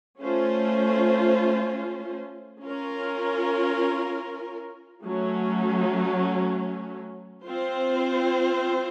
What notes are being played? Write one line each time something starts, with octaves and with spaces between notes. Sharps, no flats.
A3 C#4 F4 C5
C#4 F4 A#4
F#3 A3 C#4
C4 F4 C5